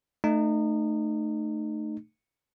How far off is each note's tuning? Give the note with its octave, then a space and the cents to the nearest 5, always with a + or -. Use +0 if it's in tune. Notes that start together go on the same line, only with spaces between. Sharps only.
A3 +0 D#4 -30